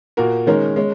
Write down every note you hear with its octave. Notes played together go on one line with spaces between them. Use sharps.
A#2 A#3 F#4 A#4
D#3 G#3 C#4 A#4
G#3 C#4